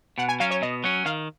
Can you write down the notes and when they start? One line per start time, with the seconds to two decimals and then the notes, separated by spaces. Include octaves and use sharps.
0.18 B2 F#5
0.29 G#5
0.40 F#3 C#4 F5
0.51 C#5
0.62 B2 D#5
0.84 F#3 C#4
1.06 D#3 F5